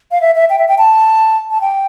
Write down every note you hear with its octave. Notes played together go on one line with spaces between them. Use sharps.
F5
E5
E5
G5
E5
G5
A5
A5
G5